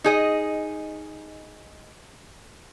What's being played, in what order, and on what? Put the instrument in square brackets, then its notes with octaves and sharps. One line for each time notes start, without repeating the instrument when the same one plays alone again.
[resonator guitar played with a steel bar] D#4 G#4 D#5